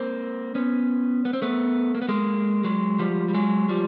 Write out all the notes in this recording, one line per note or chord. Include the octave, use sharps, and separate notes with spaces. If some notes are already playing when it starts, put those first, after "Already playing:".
Already playing: A#3 C4
B3 C#4
B3
C4
A3 B3
A#3
B3
G#3 A#3
F#3 G#3
F3 G3
G3
F#3 G#3
F3 G3